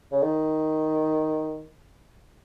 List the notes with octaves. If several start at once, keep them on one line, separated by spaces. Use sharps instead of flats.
C#3
D#3